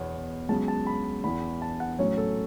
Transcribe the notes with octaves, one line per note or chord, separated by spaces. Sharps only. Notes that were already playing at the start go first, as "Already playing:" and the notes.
Already playing: E2 B2 B3 C#5
C#2 C#3 F#3 B3 A5
A5
B5
E2 E3 B3 B5
A5
F#5
A2 F#3 C#4 C#5
A4